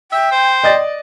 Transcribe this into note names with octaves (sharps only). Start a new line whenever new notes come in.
E5 G5
C5
D5 D#5 A6